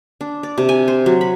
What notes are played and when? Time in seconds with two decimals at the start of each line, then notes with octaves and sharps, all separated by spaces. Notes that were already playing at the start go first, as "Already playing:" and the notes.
0.21 D4
0.43 D5
0.58 C3
0.69 G#5
0.88 C5
1.06 F#3
1.21 B5